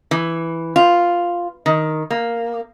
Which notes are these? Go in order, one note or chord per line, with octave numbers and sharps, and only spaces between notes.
E3
F4
D#3
A#3